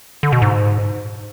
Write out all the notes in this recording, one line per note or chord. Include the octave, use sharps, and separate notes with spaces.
D3
B2
G#2